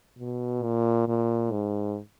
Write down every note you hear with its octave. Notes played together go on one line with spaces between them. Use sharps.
B2
A#2
A#2
G#2